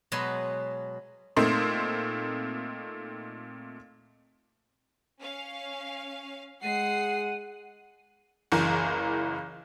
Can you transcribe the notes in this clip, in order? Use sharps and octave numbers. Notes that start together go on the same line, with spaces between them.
B2 F#3 G#3 B4 G#5 C6
A#2 A3 C4 D#4 C6
C#4 F5
G#3 F#5 C7 D#7
F#1 C#2 E3 A#4